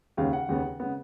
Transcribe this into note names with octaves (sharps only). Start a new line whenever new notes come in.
D#2 C#3 G#3 B3 F5
F#5
D#2 C#3 G#3 B3
C#3 G#3 B3